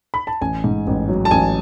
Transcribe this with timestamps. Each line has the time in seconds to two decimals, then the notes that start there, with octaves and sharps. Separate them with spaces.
0.14 B5
0.27 A5
0.41 A1 G#5
0.64 G#2
0.87 A1
1.09 F#3
1.25 A5
1.31 A1 G#5